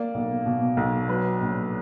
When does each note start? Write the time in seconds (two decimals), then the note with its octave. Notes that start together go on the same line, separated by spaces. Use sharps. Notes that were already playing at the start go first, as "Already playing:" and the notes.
Already playing: A#3 D5
0.14 B1
0.46 B2
0.77 B1
1.09 F#3 B4
1.40 A#1